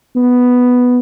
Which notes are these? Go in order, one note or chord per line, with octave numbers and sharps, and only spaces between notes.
B3